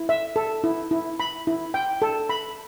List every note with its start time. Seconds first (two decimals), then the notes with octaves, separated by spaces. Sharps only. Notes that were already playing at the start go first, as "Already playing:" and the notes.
Already playing: E4
0.09 E5
0.36 A4
0.64 E4
0.91 E4
1.20 B5
1.47 E4
1.74 G5
2.02 A4
2.29 B5